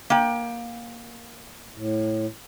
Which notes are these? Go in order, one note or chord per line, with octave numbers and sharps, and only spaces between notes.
A#3 G5
A2